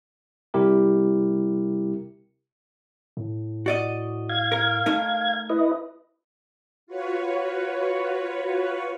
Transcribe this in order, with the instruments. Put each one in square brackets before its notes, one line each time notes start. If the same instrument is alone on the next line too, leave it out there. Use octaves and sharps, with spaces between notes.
[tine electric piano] C3 G3 E4 G4 A#4
[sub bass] A2
[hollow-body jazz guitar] F#4 D5 D#5
[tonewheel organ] F5 G#6
[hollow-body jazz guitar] A#4
A3 D#4 A#4
[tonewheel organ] E4 B4 D#5
[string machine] F4 F#4 B4 C#5